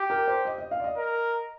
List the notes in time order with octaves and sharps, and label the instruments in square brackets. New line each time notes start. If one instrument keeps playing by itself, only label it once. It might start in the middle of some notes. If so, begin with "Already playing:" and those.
Already playing: [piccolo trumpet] G4
[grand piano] A#4
C5
D#5
D#5
F5
D5
D#5
[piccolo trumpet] A#4